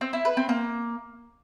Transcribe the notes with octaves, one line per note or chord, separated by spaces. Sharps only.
C4
E4
B4
C4
A#3